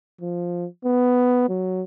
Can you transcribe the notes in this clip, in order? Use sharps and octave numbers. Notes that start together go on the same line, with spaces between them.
F3
B3
F#3